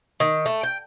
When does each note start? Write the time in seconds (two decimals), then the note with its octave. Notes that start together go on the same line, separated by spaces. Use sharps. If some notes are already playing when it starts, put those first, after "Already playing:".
0.20 D#3
0.46 A3
0.63 G5